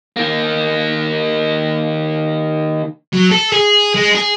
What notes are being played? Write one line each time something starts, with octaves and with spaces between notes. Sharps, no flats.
D#3 A#3
F#3
A4
G#4
G#3
G#4